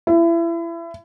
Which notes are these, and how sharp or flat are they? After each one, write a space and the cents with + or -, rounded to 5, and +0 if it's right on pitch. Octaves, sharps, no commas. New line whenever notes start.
E4 +30